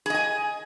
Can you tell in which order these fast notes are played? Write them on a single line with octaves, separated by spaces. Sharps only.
G#4 D#5 G#5